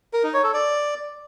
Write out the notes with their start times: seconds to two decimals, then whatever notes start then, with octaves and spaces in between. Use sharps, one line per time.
0.13 A#4
0.24 D#4
0.34 C#5
0.44 A4
0.54 D5